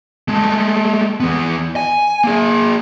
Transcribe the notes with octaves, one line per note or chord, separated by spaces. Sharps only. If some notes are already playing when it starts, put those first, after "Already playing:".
G#3 A3
E3 B3
G#5
A#3 G#4